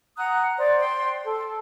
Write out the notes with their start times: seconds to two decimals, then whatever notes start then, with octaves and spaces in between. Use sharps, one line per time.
0.16 F#5 A#5 D#6 F#6
0.57 C5 D5
0.80 G5 C6
1.24 A4